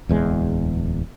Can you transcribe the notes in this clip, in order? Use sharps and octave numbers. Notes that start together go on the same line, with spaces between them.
D1 E2 G#3